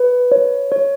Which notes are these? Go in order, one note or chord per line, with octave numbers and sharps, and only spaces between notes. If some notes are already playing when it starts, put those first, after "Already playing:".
Already playing: B4
C#5
C#5